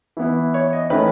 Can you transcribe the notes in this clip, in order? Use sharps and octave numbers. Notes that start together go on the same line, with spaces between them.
E3 B3 E4
C#5
D#5
D#3 A3 C#4 E4 B4